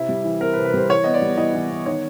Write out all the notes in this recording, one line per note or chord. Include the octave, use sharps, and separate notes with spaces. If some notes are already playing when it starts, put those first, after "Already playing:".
Already playing: C3 E4
G3
E3
C4 A#4
B4
C3
B4
G3 C5
E3 C#5
B3 D#5
D5
G3
E3 D#5
E3
B3
D#3 C#5